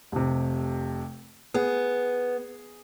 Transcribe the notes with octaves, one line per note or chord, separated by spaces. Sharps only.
F1 C3
B3 G#4